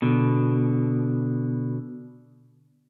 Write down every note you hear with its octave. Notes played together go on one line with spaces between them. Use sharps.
B2 D3